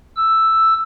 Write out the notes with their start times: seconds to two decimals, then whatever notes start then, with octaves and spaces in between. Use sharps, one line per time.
0.17 E6